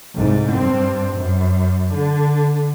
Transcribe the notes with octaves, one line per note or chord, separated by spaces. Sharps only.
C2 G#2
G2 C4
F#2
D3